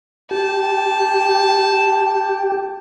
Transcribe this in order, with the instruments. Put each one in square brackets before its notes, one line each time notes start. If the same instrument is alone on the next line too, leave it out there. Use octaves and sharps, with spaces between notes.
[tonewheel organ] G4 [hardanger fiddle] A5